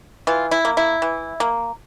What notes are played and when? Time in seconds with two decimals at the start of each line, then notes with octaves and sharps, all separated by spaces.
0.27 E3 F4
0.51 E4
0.65 A#3
0.77 E4
1.02 E3
1.40 A#3